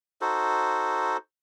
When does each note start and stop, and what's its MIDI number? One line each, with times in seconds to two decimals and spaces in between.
0.21 1.17 63
0.21 1.17 66
0.21 1.17 69
0.21 1.17 72